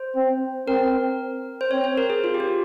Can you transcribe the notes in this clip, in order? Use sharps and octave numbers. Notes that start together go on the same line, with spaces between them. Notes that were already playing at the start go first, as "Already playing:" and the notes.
Already playing: C5
C4
C4 A#4
C5
C4 C#5
C5
A#4
G#4
F4
G4
F4